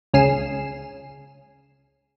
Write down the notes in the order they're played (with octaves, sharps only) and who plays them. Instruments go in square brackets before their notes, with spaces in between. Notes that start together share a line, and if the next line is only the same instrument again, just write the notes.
[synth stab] C#2 C#4 G#4 C7 E7